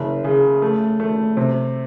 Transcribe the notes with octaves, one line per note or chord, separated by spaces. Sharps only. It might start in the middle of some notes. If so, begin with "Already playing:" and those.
Already playing: F#1
C#3
A3
A3
C3